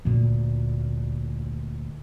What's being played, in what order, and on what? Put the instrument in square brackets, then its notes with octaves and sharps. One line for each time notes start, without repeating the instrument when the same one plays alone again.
[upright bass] D2 A#2